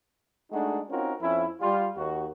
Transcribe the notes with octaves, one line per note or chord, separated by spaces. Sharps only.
G#3 A3 D4 D#4 F#4
C4 C#4 D#4 F4 F#4 A#4
F2 F3 C#4 E4
G3 F4
D#2 F#4